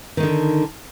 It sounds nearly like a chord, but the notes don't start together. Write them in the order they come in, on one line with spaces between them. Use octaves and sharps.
D#3 D#4 D3